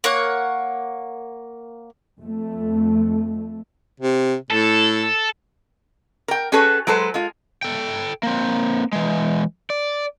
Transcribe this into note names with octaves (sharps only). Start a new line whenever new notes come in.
A#3 C#5 F#5
F2 A3
C3
A2 A4
A#4 G5
C#4 F#4 G#4 A4 B4 C#5
F#3 G#3 A4 B4 C5
G#3 F4
A4 G5
A#3 C4
E3 G#3
D5